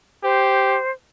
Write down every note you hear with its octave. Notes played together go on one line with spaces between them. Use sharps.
G4 C5